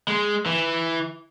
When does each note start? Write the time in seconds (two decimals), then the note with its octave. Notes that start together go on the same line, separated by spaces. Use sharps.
0.08 G#3
0.46 E3